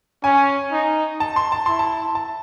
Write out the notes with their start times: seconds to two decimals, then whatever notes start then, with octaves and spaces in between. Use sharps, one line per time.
0.24 C#4 G#5
0.72 D#4
1.20 A5
1.36 C6
1.52 A5
1.66 E4 C6
1.79 A5
2.15 A5